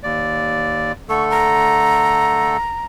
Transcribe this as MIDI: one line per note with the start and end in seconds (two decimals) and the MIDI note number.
0.03 0.92 39
0.03 0.92 74
1.09 2.57 50
1.09 2.57 57
1.09 2.57 69
1.09 1.25 85
1.30 2.85 82